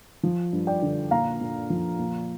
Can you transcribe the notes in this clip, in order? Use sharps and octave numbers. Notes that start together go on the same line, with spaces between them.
F3
G2
D5 G5
D3
A#2 F5 A#5
A#2
F3
A#2